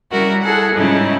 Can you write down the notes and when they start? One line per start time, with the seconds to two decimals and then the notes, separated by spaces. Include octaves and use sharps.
0.12 C#3 G3 E4 F#4 A#4
0.43 E4 G#4 A4 F#5
0.74 G#2 C#3 F3 G3 D#4 E4